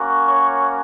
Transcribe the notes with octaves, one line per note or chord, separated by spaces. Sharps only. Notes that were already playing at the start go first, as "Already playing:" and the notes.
Already playing: A#3 C#4 F#4
C#5